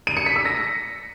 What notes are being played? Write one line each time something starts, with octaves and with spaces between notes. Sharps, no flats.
D#7
C#7
B6
E6
A#6